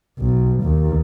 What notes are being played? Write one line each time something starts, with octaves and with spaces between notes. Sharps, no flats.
B1
D#2